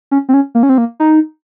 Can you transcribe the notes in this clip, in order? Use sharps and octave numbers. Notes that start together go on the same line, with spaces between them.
C#4
C4
C#4
A#3
C#4
C4
A#3
D#4